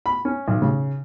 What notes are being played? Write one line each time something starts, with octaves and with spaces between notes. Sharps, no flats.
B5
C#4
B1
C#3